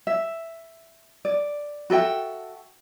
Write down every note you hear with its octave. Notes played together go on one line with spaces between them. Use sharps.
E5
D5
F#4 A4 E5 G5